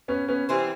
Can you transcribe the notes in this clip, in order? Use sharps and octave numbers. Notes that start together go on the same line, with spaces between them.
B3 C#4
B3 C#4
E3 G3 C4